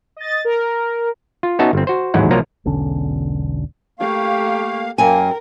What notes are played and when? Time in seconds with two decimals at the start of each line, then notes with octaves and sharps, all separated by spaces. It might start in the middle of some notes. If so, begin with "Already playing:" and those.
0.17 D#5 A6
0.45 A#4
1.43 F4
1.59 B3 C#4 D#4 F#4 E5 A5
1.73 G1 C4
1.87 F#4 C5
2.14 A1 D#2 G#2 F#3 E4 F#5
2.31 C2 F3 F#3 A#3 F4 A#5
2.65 E1 B1 D3 C#4
3.99 A3 A#3 G4 F5 C#6
4.98 F#2 A#3 A#4 G5 G#5